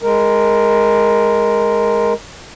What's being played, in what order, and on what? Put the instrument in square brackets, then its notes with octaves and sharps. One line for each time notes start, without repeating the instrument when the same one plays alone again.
[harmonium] G#3 A#4